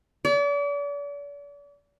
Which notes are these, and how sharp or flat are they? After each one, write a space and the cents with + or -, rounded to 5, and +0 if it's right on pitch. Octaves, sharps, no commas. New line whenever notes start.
D5 -40